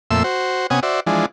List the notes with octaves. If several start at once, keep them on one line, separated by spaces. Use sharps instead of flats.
F2 A#2 A3 E5 C6 E6
F#4 C5
C3 B3 C#4 F#5 G#5 D#6
F#4 C5 D5 E5
E3 F3 G#3 D4